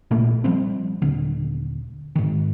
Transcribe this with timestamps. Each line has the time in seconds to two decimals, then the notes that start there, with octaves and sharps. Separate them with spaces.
0.11 A#1 A#2 A3
0.44 F3 G3 C4
1.02 D#1 D3
2.15 G#2 D#3